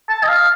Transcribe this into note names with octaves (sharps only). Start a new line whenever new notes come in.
A5
D#5
F5